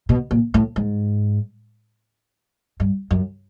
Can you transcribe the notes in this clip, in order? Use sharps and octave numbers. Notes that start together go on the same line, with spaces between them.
B2
A#2
A2
G#2
G2
F#2